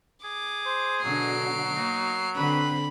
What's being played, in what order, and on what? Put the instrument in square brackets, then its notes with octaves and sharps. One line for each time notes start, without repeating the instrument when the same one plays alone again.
[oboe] G#4 [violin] D6
[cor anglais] C5
[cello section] B2 D3 F#4 [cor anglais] F#3 [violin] C7 D7
[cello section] A#3 [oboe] D#4
[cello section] D3 C4 [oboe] B4 [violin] B5